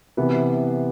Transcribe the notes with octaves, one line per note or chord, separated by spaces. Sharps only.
C3 E3 B3 B4